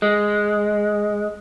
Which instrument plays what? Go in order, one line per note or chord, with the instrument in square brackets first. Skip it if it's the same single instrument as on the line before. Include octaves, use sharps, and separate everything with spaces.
[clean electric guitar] G#3